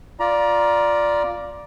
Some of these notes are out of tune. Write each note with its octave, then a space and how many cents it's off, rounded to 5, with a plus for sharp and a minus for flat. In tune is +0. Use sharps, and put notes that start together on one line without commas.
F4 +0 D5 +0 A#5 +25